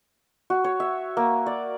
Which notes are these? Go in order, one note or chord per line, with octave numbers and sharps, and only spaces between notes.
F#4
C#5
E5
A#3
D5